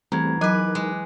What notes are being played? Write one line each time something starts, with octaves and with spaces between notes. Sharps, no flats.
E2 G3 A3 C4 A#5 G#6
F#3 D#4 A#4 B4 G#5 D6 F#6
G#3